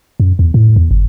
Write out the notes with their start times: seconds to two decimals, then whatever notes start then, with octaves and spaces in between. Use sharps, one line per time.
0.20 F#2
0.39 E2
0.54 A2
0.76 E2
0.91 G1